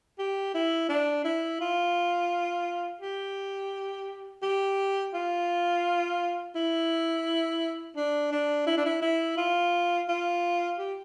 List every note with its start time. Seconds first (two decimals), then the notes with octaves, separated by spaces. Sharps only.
0.19 G4
0.55 E4
0.89 D4
1.24 E4
1.61 F4
3.01 G4
4.43 G4
5.14 F4
6.55 E4
7.96 D4
8.32 D4
8.67 E4
8.77 D4
8.86 E4
9.02 E4
9.37 F4
10.09 F4
10.79 G4